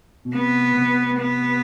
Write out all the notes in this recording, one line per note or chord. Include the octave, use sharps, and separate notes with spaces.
B2
C3 B3
C3
B3